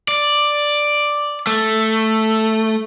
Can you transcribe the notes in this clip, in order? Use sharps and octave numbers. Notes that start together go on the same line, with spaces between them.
D5
A3